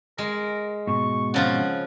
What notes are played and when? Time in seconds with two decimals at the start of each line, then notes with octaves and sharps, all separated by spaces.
0.18 G#3 A#4
0.87 G#2 B2 C#6
1.34 C#3 F3 F4 F#5